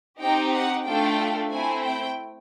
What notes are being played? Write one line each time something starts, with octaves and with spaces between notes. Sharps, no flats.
C4 D#4 G4 G5
F#5
A3 D4 F4 A4 G5
A3 C4 E4 G#5
G5